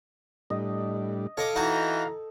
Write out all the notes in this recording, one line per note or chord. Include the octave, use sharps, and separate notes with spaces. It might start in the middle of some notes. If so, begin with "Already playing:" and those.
A2 G3 D4 D#5
A4 C#5 D#5 F5 D6
E3 D#4 F#4 G#5 A#5